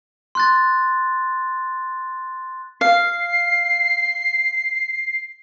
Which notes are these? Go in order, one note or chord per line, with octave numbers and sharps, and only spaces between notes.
C6 F#6 A6
F5 C7